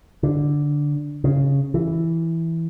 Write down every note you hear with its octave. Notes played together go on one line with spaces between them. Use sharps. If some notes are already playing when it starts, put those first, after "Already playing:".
D3
C#3
E3